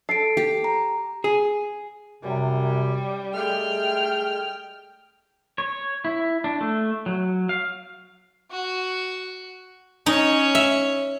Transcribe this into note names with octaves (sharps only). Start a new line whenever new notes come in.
A4 C7 D7
G4
A#5
G#4
F#2 C3 G3
G#3 A3 G#4 G5 F6
C#5
E4
D4
A3
F#3
F5
F#4
C#4 D#4 C#5
E5